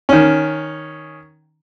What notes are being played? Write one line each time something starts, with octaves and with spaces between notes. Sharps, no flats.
D#3 C#4